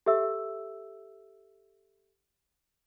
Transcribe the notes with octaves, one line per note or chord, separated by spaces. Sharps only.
G4 A4 E5 E6